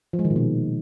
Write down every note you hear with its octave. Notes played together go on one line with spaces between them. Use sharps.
F3
G#3
D#3
A#2
B2